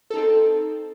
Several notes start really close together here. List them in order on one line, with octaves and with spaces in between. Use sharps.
A4 D#4 C4